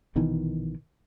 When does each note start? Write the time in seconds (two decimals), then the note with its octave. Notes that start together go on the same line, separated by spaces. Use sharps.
0.15 A#1 B2 D#3 E3